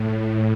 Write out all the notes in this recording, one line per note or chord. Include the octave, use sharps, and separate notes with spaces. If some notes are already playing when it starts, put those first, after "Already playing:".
Already playing: A2